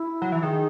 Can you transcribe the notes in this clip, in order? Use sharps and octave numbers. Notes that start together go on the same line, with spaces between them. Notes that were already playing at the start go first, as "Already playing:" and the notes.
Already playing: E4
F#3
E3
D#3 G#4